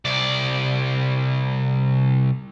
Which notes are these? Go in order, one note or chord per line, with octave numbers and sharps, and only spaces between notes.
C2 D5